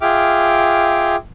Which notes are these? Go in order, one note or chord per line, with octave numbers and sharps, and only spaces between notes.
F4 G#4 E5 G5 D6 F6